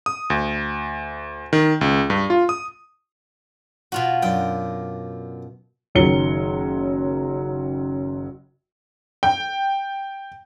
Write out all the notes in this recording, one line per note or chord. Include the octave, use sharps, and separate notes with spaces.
D#6
D2
D#3
C#2
G2
F4
D#6
B2 F4 F#4
F#2 D4 G5
F#1 D#3 F#3 C#5 C#7 G7
G5